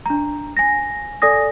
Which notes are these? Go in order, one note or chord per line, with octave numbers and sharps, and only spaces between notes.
D4 A#5
G#5 A#6
A4 D5 G#5 D#6 A#6